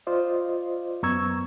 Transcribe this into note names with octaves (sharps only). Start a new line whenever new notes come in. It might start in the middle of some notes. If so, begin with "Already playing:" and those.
F4 C5 D5 D#5
F#2 B3 A#5 C#6 E6 G#6